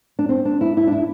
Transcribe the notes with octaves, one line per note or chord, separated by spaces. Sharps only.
D4
C4
D4
E4
E4
D4
E4